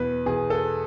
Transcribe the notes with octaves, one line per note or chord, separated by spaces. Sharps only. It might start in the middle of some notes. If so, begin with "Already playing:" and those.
Already playing: E2 B2 B4
E2 B2 G#4
A4